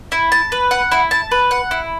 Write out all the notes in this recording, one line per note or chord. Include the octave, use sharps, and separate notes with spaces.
E4
A5
B4
F#5
E4
A5
B4
F#5
E4